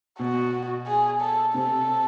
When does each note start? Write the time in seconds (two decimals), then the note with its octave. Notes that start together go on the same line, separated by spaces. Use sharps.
0.19 B2 F#4
0.87 G#4
1.21 A4
1.54 C3 A4